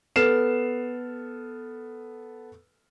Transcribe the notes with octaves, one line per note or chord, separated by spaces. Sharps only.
B3 A4 F6 C7 E7